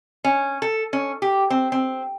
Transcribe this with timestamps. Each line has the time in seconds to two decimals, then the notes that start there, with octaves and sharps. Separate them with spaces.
0.24 C#4
0.62 A4
0.93 C#4
1.22 G4
1.50 C4
1.72 C4